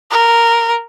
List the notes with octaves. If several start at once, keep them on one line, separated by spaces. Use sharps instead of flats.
A#4